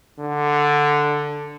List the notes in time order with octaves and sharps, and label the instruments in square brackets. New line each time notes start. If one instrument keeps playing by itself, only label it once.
[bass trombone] D3